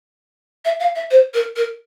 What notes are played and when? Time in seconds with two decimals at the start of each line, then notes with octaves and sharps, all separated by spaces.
0.65 E5
0.80 F5
0.95 E5
1.11 C5
1.34 A#4
1.56 A#4